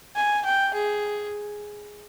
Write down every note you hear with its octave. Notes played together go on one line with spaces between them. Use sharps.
G#5
G5
G#4